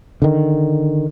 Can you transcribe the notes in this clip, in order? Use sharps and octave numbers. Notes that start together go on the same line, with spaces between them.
D3 D#3